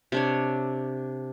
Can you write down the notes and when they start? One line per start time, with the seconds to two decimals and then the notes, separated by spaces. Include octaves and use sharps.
0.12 C3 D4 C#5